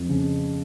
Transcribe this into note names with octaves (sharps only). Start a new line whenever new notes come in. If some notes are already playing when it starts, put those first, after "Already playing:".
Already playing: F2
C#3